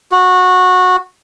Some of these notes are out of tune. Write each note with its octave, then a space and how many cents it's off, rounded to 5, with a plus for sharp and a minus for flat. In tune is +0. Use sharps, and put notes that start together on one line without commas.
F#4 -20